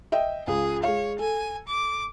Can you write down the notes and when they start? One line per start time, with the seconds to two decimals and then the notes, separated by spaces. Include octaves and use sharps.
0.12 D#5 E5 G5
0.47 C#2 C#3 G#4
0.83 G#3 C#5 F5
1.19 A4 G#5
1.68 D6